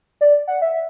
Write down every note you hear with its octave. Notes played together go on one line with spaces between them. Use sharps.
D5
F#5
E5